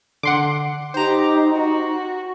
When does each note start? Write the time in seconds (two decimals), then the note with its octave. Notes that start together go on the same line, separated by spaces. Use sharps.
0.23 D3 F#5 C6 D6
0.94 D#4 G4 C5 A#5
1.51 F#4